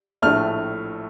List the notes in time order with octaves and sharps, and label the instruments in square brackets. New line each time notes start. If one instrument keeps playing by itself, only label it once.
[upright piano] A#1 A2 A3 F6